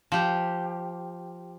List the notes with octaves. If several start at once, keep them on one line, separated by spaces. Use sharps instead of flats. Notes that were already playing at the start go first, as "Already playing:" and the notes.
F3 G4